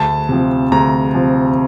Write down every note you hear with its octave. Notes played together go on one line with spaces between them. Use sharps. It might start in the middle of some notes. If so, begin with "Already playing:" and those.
Already playing: D2 A5
C3 F3
D2 A#5
C3 F3